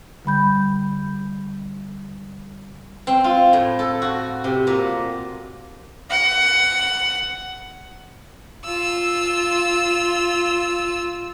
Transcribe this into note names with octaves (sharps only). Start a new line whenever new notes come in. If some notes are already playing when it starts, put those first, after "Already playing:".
D3 G3 B5 G6
C4
F4
A2
A4
F#4
C3
A#2
F#5
F4 E6